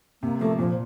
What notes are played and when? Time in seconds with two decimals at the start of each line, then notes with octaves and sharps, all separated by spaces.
0.22 C3 A#3
0.40 F3 A3 A#3
0.59 A#2 F3